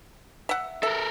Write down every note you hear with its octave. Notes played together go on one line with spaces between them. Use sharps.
E5 F#5
A4 A#4 E5